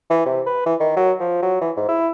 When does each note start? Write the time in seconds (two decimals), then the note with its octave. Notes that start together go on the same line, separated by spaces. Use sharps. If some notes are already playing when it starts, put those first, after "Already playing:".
0.10 E3
0.26 C3
0.46 B4
0.66 E3
0.80 D#3
0.96 F#3
1.20 F3
1.42 F#3
1.61 E3
1.77 G#2
1.88 E4